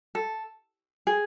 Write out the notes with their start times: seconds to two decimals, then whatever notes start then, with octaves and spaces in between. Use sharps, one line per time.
0.15 A4
1.07 G#4